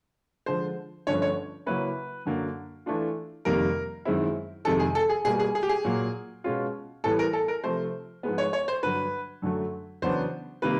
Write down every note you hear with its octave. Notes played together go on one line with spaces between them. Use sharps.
D3 F3 G#3 C5
G2 D3 F3 A3 C#4 C#5
C#5
C#3 F#3 A#3 C#4 E4 B4
F#2 D3 F#3 A#3
E3 A3 D4 F4
F2 C3 D#3 G3 A#3 A#4
F#2 D#3 G#3 C4 E4
F2 C3 D#3 G#3 A4
G#4
A4
G#4
B2 G3 A#3 G#4
G#4
G#4
G4
G#4
A#2 F#3 A#3
B2 G#3 C#4 F4
A2 E3 G3 B3 A4
A#4
A4
A#4
C3 F3 A3 C5
G#2 F3 G#3 B3
C#5
C#5
C5
G2 D3 F#3 B4
F#2 D3 F#3 A3
E2 C#3 F#3 B3 D4 C5
C3 D#3 G3 A#3 B4